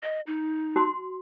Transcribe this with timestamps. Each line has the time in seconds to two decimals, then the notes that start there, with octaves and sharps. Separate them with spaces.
0.03 D#5
0.27 D#4
0.76 F#4 C6